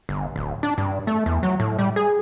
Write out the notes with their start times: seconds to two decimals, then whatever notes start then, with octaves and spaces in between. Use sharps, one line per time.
0.09 G1
0.36 D1
0.63 D4
0.78 G2
1.07 A3
1.26 E2
1.43 F#3
1.60 A2
1.79 G3
1.96 G#4